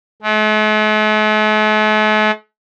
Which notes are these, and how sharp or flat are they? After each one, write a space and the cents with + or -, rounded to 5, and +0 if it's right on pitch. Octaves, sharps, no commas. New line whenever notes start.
A3 -45